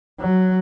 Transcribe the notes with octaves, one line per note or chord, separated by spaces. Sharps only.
F#3